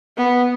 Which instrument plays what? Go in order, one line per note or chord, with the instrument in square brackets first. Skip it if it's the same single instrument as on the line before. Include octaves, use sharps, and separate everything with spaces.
[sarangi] B3